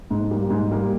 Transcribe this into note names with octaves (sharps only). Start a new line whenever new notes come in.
G#2
G3 A#3
G#2
G3 A#3